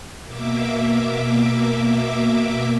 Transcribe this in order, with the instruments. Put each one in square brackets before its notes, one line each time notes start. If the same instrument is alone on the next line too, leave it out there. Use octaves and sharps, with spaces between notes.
[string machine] B2 A#3 E5 D6